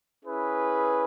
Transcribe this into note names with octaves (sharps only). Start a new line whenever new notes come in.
C#4 E4 G#4 B4